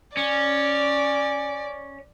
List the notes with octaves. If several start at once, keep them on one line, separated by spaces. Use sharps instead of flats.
C#4 D5